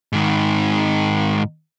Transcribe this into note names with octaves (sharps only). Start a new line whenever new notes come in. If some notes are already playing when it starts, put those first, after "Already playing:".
G#2 D#3